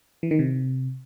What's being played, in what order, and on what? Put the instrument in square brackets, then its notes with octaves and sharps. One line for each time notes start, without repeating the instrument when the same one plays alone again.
[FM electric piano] E3
D#3
C3